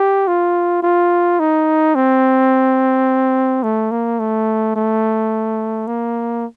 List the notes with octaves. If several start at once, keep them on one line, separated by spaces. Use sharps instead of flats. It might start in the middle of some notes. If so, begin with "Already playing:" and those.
Already playing: G4
F4
F4
D#4
C4
A3
A#3
A3
A3
A#3